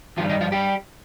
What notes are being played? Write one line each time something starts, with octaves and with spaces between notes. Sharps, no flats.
G2 D#3 F3 G3 F4
D#3 D#4
F3 F4
G3 G4